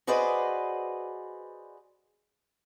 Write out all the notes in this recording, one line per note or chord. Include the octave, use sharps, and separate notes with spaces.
F#4 G#4 B4 C5 D5 D#5